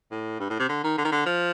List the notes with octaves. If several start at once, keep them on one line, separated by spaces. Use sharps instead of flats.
A2
G2
A2
C3
D3
D#3
D3
D#3
D3
F3